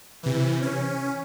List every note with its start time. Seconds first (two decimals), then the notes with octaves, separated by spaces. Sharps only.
0.23 C3 E3
0.62 C#4